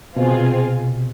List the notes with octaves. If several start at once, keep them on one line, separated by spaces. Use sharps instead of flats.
B2 C4 F4 G#4
C3